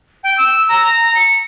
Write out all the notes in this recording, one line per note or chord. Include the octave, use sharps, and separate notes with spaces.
G5
E6
A#5
C#7